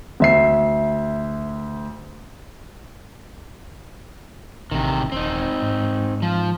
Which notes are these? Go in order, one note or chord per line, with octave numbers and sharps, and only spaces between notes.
D2 E5 C7
A1 C3 D#3
D#1 C4 D#4
G#2
F3